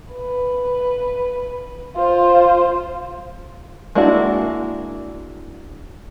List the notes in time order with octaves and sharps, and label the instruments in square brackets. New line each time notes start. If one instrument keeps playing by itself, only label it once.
[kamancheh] B4
F4 C5
[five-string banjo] G#3 A#3 D4 E4 F#4